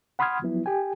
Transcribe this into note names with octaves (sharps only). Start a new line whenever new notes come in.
F#5 B5 C6 D#6 F6 G#6
F3 F#3 B3 E4
G4 G5 G#5